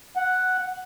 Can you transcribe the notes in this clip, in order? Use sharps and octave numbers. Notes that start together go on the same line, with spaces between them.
F#5